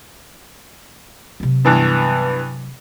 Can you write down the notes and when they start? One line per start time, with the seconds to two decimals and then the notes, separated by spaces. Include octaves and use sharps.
1.40 C3 F#3
1.65 G2 E3 B3